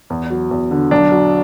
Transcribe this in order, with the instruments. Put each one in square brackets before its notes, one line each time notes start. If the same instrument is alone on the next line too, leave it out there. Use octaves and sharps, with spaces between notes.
[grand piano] E2
F#3
E2
D3
B1 D4
F#3